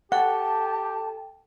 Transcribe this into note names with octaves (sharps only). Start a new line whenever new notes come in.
G4 A4 F#5 G5 A5